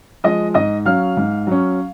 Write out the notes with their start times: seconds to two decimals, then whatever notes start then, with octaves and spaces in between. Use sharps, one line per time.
0.24 F3 G#3 D#5 D#6
0.54 G#2 D#5 D#6
0.85 F#3 C#4 F5 F6
1.17 G#2
1.47 F#3 C#4